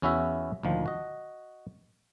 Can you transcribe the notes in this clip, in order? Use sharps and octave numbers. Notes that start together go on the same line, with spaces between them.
E2 C#4 E4 F#4 E5
D2 A#2 D#3 F3
F#4 D#5